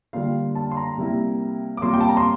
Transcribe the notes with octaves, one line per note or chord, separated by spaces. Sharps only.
D3 G3 A#3 D4 F4 F5
A5
C6
A#5
C3 G3 A#3 E4
D6
C3 G3 A#3 F4 C6
G5
A5
A#5
C6